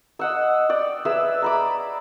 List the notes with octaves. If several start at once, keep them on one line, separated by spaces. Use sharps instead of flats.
D#5 F#5 E6
D5 G5
G#4 B4 E5 E6
A#5 B5 D6